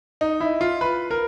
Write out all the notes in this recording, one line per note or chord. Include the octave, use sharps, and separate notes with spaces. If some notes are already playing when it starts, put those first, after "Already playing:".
D#4
E4
F4
B4
A#4